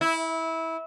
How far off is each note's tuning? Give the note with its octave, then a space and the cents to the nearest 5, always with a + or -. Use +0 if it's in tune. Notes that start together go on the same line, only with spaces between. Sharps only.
E4 -20